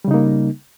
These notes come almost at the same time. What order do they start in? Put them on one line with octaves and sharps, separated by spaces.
G3 C#3 D#4 A#3